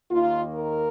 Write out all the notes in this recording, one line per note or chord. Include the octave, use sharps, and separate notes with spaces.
D#2 D#3 A#3 F4
A#4